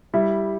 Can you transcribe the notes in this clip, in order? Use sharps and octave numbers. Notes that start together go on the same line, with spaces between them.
G3 E4